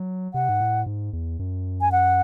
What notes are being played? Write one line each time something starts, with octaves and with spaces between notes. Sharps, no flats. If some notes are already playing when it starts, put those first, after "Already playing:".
Already playing: F#3
C3 F#5
G#2
A2
G#2
E2
F#2
G#5
F#5